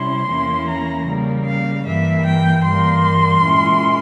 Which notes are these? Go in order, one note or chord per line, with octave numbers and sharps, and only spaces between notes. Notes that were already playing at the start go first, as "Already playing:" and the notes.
Already playing: C3 G3 C#4 E4 C6
E2 E3 A#3 C#4 E4
A#5
C#3 G3 A#3
F5
G2 E3 A#3 E5
G5
G2 E3 G3 A#3 C6
A#2 G#3 C#4 E4